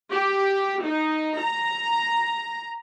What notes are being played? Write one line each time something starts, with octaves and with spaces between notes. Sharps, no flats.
G4
D#4
A#5